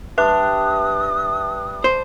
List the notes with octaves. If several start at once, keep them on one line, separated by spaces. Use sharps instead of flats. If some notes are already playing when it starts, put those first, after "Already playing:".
G3 D4 G4 B4 E5 D#6 F#6
C5